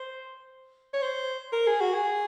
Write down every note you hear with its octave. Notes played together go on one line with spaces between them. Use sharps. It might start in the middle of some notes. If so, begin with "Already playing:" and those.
Already playing: C5
C#5
C5
A#4
G#4
F#4
G#4